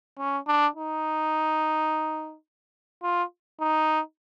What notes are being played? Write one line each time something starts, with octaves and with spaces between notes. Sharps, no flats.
C#4
D4
D#4
F4
D#4